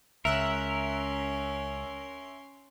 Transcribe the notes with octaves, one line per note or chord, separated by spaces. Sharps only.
C#2 C#4 A#4 E5 C6 F#6